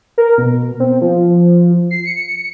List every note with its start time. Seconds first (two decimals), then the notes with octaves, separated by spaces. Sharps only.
0.18 A#4
0.38 B2
0.80 C4
1.01 F3
1.91 C7
2.05 C#7